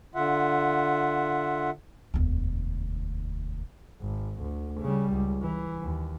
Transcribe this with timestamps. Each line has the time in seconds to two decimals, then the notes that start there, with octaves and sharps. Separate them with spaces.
0.15 D3 F4 E5 F#5
2.14 E1 D2
4.01 G#1
4.41 D2
4.81 C#3 G3
5.13 C#2
5.42 E3
5.82 D#2